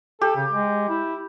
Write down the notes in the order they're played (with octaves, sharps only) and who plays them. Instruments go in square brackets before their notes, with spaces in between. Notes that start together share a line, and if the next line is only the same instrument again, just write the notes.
[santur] G4 [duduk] A4
[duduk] C#3
G#3
E4